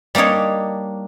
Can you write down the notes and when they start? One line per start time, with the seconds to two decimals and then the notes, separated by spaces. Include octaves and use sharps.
0.15 G3 A#3 D4 D#4 C#5